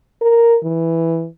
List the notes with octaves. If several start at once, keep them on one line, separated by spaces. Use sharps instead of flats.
A#4
E3